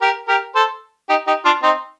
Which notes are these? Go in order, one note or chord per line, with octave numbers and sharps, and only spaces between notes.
G4 A#4
G4 A#4
A4 C5
D#4 G4
D#4 G4
D4 F4
C4 D#4